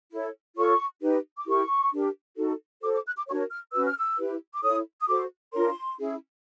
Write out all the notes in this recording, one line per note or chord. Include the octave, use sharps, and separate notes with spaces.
E4 A4 C#5
F4 A4 C#5 C#6
D#4 G4 B4
D6
E4 G4 A#4 C#6
D4 G4 A#4
D#4 F#4 A4
F#4 A4 C5 D6
D6
F#6
D6
D4 F#4 A#4 C#5 C#6
F6
C#4 F#4 B4 E6
F6
E6
E4 G4 B4
D6
E4 A4 C#5 D#6
D#6
F#4 A4 C5 D6
D4 F4 A#4 C#5 C6
C#4 E4 G#4